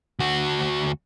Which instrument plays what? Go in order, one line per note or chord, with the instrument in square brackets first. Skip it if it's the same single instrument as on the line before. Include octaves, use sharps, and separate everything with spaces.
[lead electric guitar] D2 F#4